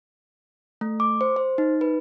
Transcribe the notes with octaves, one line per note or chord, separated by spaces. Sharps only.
A3
D6
C5
C5
D#4
B4